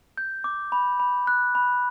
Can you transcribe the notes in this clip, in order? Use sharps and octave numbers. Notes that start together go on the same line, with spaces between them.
G6
D6
B5
B5
F#6
B5